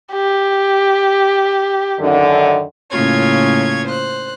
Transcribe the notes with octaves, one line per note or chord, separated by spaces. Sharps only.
G4
F#2 D3 D#3
A2 C#3 A#3 F4 C#5 G#6
C5 F#6